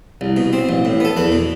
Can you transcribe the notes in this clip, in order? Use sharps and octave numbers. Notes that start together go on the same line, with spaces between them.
C2
B2
C4
A1
A2
B3 A4
E2 B4
B2